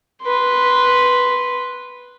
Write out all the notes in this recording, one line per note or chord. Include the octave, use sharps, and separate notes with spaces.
B4 C6